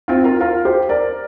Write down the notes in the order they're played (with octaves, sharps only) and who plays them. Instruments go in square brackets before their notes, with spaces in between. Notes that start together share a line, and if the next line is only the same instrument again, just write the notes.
[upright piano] C4 F4
F4 A#4
F4 A#4
G4 C5
A#4 D5